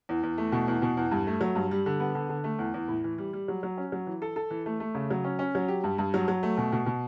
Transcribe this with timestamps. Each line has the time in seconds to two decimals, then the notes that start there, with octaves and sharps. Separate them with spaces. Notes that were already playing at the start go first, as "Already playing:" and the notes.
0.09 E2
0.23 E2
0.38 A3
0.52 B2
0.68 E2
0.82 B2
0.97 E2
1.11 G2
1.27 A3
1.41 F#3
1.55 G2
1.71 G3
1.86 D3
2.00 B3
2.15 D3
2.29 D3
2.44 A3
2.59 E2
2.74 E2
2.88 A2
3.04 E3
3.18 G3
3.33 G3
3.48 F#3
3.63 F#3
3.77 C#4
3.92 F#3
4.06 E3
4.22 A4
4.36 A4
4.50 E3
4.66 A3
4.80 A3
4.95 C#3
5.10 F#3
5.24 C#4
5.39 C#4
5.55 F#3
5.68 G4
5.84 G2
5.98 G2
6.14 F#3
6.28 F#3
6.43 A3
6.58 B2
6.72 B2
6.86 B2